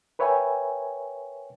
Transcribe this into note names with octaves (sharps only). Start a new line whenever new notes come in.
A#4 B4 C#5 E5 G5 G#5